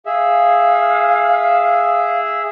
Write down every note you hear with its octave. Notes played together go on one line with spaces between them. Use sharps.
G#4 E5 F5